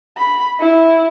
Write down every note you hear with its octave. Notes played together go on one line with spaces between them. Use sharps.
B5
E4